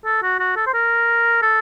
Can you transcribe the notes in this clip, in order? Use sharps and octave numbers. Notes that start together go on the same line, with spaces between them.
A4
F#4
F#4
A4
C5
A#4
A4